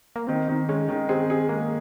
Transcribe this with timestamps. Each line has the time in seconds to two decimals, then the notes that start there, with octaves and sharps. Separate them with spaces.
0.16 A#3
0.27 D#3 C4
0.48 D#3
0.69 G#3 C#4
0.89 D#3
1.09 C4 G#4
1.30 G#4
1.49 G#3 A#3